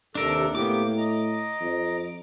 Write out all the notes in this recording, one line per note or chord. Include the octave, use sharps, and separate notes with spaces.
D#2 C3 D4 A4 A#4
A2 A#3 B3 G4 D6
D#5 A#5
F2